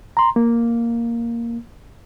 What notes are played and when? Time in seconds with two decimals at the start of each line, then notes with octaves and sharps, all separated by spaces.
0.17 A#5 C6
0.36 A#3